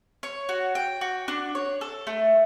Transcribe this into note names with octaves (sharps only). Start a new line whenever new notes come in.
C#5
F#4
G5
F#4
D4
C#5
A4
A3